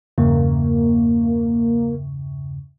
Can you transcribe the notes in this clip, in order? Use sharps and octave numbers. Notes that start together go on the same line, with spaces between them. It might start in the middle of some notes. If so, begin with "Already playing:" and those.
E2 G2 C#3 A#3